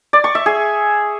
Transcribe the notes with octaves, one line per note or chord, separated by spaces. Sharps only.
D5
C#6
E5
G#4